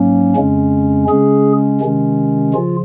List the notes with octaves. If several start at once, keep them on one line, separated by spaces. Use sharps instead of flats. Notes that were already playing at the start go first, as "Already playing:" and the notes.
Already playing: G#2 F#3 A#3 C#4
F2 C#3 G#3 C#4
C#3 G#3 C#4 G#4
C3 D#3 G#3 C#4
C#3 F3 F4